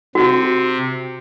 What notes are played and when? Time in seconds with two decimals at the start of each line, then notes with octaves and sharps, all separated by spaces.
0.15 C3 F#4